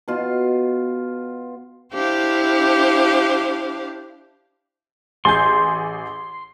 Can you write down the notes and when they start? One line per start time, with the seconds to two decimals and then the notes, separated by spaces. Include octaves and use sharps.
0.08 B2 F4
1.93 D4 E4 G4 C5 F5
5.25 A1 G#4 C6 G6